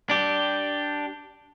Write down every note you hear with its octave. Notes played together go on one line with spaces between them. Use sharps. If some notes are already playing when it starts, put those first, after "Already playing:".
D4 G4